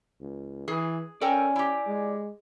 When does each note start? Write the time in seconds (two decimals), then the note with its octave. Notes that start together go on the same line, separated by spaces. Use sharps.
0.20 C#2
0.68 E3 G#4
1.21 C#4 A4 A#4 D5 G5 G#5
1.56 E4 G4
1.87 G#3